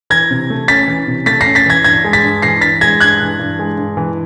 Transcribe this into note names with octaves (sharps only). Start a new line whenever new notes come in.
E3 G#6 A#6
C3
A3
C#4 A6 B6
E3
C3
A3 A6 B6
A#6 C7
C#4
A6 B6
E3 G#6 A#6
G2 G#6 A#6
G#3
A6 B6
G2
E3 A#6 C7
G2 A6 B6
G#3 G#6 A#6
G2 F#6 G#6
E3
G2
G#3
G2
E3